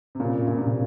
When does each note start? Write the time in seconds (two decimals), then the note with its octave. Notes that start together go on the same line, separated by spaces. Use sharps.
0.15 C3
0.20 A#2 C#3
0.48 A#2
0.54 C3
0.61 A#2